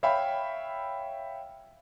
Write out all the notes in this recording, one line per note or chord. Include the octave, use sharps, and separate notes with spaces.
C#5 E5 F5 G5 B5